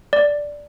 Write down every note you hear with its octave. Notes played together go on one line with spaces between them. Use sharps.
D5